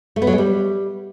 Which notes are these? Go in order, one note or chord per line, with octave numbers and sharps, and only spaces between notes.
A3
B3
F#3
G#3
G3